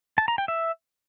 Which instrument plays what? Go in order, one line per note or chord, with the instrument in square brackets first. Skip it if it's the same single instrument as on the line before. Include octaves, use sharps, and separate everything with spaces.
[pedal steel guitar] A5
A#5
G5
E5